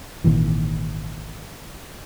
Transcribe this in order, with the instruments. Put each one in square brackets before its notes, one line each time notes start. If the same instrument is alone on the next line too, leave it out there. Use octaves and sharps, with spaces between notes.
[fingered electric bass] G#1 A#2 D#3 E3